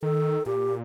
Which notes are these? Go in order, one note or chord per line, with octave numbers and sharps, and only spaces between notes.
D#3 A4
A#2 G4